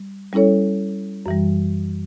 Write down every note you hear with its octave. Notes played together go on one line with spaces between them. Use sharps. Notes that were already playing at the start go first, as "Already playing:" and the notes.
Already playing: G3
G3 C#4 E4 A4 C#5
F#2 E3 G3